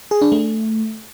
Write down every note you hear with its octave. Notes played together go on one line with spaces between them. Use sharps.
G#4
D4
A3